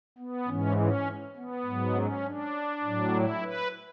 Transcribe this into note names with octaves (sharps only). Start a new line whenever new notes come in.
B3
G#2 E3 C#4
C#4
B3
G#2 F#3
C#4
D4
A2 F#3
E4
B4